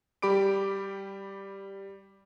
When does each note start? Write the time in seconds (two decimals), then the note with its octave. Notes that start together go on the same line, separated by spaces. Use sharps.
0.22 G3 G4 B5 D6 D7